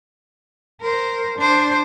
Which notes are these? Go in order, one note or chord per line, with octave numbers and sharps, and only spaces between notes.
A#4 C5
D4 C5